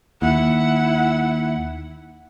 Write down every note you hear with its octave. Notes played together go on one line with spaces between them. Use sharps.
D#2 E4 F#5